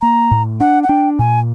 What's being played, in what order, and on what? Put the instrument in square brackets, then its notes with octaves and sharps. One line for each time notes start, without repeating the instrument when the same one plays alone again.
[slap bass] A#3 [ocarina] A#5
[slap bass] A2
[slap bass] D4 [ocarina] F#5
[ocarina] F#5
[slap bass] D4 [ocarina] G5
[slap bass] A#2 [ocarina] G#5